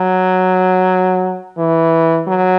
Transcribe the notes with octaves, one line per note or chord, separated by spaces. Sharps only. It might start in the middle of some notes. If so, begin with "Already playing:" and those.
Already playing: F#3
E3
F#3